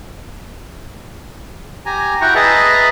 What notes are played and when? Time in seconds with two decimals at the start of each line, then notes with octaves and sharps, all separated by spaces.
1.86 G4 G#5 A#5
2.21 E4 F#4 G5 A#5 C#6
2.35 G#4 B4 D#5 E5 A5 A#5